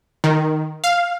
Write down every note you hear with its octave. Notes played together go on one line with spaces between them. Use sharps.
D#3
F5